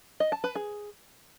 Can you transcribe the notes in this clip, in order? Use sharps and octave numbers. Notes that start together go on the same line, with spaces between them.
D#5
A5
B4
G#4